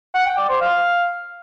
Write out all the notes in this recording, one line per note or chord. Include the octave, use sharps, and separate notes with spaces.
F#5
G5
D5
C5
F5